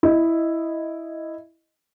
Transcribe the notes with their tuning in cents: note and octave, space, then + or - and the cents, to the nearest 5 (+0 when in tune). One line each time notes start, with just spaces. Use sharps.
E4 +0 D#5 +0